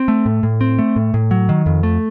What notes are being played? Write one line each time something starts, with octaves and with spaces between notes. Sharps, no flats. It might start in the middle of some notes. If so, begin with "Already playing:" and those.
Already playing: C4
A3
A2
A2
C4
A3
A2
A2
F#3
D#3
F2
A3